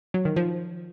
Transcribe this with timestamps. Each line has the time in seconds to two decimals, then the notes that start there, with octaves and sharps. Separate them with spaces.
0.14 F#3
0.25 D#3
0.37 F3